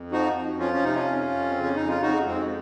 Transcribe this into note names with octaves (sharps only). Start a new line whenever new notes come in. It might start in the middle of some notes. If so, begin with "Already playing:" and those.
Already playing: F2
F3 D#4 F#4
F2
F3 C#4 F4
C#4
C3 D#4
C#4 F4
F2
F2
C#3 C4
C#4
F2 D#4
F4
F2 D#4 F#4
F2 G#3 C4